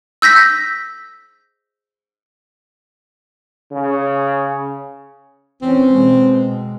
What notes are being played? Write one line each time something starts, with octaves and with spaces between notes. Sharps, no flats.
E6 G6 A#6 B6
C#3
E3 C4 C#4
B2 G#3